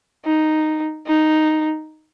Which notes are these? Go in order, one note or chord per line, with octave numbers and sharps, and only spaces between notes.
D#4
D#4